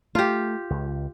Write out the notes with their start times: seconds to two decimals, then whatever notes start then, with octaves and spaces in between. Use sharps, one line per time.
0.15 A3 F4 G4
0.70 C#2